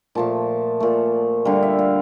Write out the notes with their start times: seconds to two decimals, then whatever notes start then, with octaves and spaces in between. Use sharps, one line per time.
0.15 A#2 F3 A3 A5
0.80 A#2 A3
1.45 D3 G3 F5
1.63 E5
1.79 F5